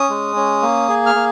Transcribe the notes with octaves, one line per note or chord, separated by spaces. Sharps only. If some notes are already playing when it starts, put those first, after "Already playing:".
Already playing: C#4 D#6
G#3
C#4
A#3
G#4
F6
A#3